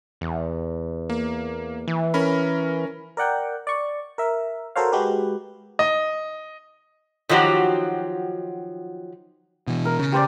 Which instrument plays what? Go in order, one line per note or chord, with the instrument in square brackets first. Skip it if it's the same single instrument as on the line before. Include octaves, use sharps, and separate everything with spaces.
[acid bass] E2
[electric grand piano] A#3
[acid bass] E3
[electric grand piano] C#4 A#4 B5
[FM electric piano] A#4 D5 F#5 G5
D5 C#6
A#4 E5
F#4 A4 A#4 C5 C#5 F5
G#3 F#4 G4 B4
[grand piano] D#5
[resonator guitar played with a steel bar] D#3 F3 F#3 F#4 G4
[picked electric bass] B2 E3
[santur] A#4
[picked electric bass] C#3
[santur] G4 C5 D5